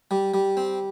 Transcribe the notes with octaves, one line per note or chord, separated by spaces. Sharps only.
G3
G3
C4